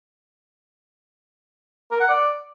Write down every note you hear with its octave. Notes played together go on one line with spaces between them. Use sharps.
A#4
F#5
D5